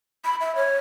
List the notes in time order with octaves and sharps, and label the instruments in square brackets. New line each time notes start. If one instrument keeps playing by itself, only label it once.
[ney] B5
E5
C#5